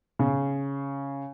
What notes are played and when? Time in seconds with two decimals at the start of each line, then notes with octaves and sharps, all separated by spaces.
0.19 C#3